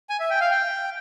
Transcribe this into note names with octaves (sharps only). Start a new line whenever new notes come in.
G#5
E5
G5
F5
G5